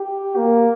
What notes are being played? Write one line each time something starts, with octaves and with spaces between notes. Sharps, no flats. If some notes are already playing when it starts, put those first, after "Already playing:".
Already playing: G4
A#3